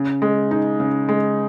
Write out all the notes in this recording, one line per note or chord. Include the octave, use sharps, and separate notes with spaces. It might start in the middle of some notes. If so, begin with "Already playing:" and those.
Already playing: C#3
G#3
D#4
C#3
G#3